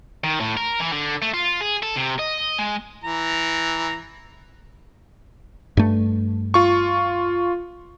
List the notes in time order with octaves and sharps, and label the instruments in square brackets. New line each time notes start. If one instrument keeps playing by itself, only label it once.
[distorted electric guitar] D#3
A2
A#4
E3
D3
A3
F4
G#4
A4
C3
D#5
G#3
[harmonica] E3 A#5
[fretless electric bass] G2 A3
[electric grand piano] F4 C#6